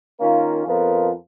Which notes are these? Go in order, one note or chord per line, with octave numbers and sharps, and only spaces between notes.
D#3 A#3 C#4 F4 A#4
F2 F3 B3 F4 A#4